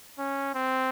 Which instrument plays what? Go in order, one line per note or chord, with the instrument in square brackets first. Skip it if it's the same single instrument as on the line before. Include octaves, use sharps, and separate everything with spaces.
[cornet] C#4
C4